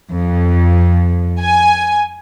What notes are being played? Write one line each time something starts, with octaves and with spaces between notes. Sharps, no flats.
F2
G#5